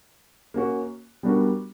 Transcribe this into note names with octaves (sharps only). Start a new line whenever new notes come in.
A#3 C#4 F#4
G3 B3 D4 F#4 A#4